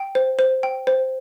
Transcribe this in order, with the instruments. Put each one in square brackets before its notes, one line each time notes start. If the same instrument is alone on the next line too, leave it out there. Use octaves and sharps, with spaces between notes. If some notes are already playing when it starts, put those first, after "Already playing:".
Already playing: [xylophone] G5
C5
C5
G5
C5